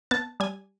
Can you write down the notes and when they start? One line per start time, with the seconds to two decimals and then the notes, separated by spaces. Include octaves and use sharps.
0.11 B3 A5
0.40 G3 G#5